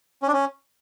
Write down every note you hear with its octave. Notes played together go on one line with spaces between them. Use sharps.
C#4
D4
C#4